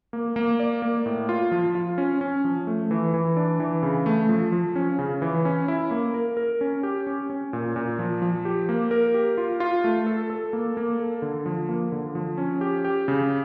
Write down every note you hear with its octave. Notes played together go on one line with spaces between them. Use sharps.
A#3
A#3
D5
A#3
A2
F4
F3
F4
C#4
C#4
F3
A3
E3
E3
D4
E3
C#3
A3
F3
F3
C#4
C#3
E3
C#4
E4
A#3
A#4
A#4
C#4
G4
C#4
C#4
A#2
A#2
F3
F3
G4
A#3
A#4
G4
F4
F4
A3
A4
A4
A#3
A#3
A4
D3
F3
A#3
D3
F3
C#4
G4
G4
C#3